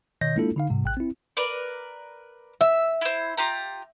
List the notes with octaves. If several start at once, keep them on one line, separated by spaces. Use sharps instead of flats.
B2 D#3 C#5 D#5 G6 A#6
G#3 A#3 D4 E4 F4 A4
D3 D#4 F5
G#2 C3 G3
A1 G5 F#6
C4 E4
A#4 B4 D5
E5 E6
E4 C5
F4 G4 A#5